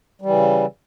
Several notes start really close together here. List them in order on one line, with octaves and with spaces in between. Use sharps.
G3 E3 C#3